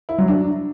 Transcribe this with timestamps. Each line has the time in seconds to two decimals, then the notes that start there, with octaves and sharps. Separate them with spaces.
0.09 E4
0.18 F#3
0.28 D4